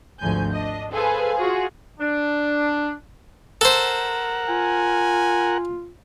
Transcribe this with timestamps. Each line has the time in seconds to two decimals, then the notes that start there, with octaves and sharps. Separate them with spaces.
0.19 G#1 D2 F3 G#5 G6
0.51 D4 D#5
0.92 G#4 A4 B4 C5 F5 G#5
1.37 F4 F#4 G#4
2.00 D4
3.61 A4 A#4 C5 F#5
4.49 F4 G#5